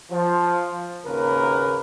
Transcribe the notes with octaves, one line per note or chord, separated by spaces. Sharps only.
F3
G#1 D#2 C#3 A#3 A#4 B4